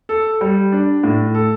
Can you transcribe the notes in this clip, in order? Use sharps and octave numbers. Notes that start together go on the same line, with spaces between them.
A4
G3
D4
A2
A4